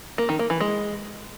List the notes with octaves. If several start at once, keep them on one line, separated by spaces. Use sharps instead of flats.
A#3
D#3
A#3
E3
G#3